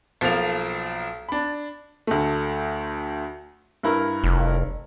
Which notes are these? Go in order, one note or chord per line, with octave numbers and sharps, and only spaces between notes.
B1 F3 A#3 F7
D4 B5
D2 A3
G2 E4 A#4
F1